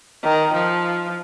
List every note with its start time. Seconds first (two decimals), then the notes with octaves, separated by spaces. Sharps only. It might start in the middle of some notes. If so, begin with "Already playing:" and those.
0.23 D#3
0.53 F3